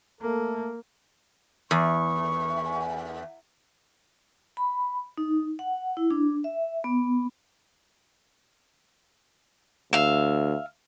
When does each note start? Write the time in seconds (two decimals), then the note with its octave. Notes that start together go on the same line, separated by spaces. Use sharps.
0.21 A3 A#3 A4
1.71 E2 C#6
4.57 B5
5.17 D#4
5.59 F#5
5.97 E4
6.11 D4
6.44 E5
6.84 B3
9.93 D2 E5 F5